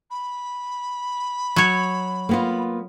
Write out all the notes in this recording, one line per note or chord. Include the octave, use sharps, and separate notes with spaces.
B5
F#3 C#5
A#3 B3 F4